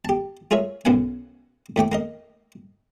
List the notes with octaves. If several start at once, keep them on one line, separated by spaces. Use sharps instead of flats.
G4 A5
F4 G#4 A#4 C#5 E5
B1 F#2 B2 F5 F#5 G#5
A2 A3 G5 D6
A#3 A#4 D#5